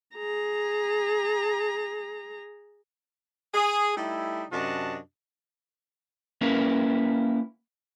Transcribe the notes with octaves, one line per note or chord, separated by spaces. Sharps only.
G#4 A#5
G#4
G3 A3 D#4 E4
F#2 C3 D4 F#4 D#5 A5
A#3 C#4 E4 A#4 B4